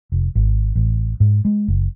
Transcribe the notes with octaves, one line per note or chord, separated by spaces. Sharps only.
F1
G#1
A1
G#2
G#3
F#1